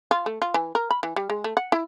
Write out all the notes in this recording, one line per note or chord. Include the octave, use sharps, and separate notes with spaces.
F4
A3
F4
E3
A#4
B5
E3
G3
G#3
A3
F#5
E4